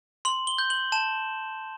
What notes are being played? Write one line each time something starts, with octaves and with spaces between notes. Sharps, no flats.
C6 F#7
G7
G6
F#7
A5 E7